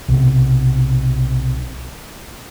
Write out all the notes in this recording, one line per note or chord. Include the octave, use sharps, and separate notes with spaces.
B1 C3